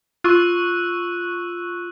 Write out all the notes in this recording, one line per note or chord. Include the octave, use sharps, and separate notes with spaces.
F4 C#6 E6 F#6